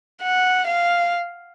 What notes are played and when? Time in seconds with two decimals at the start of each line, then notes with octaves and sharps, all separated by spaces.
0.22 F#5
0.67 F5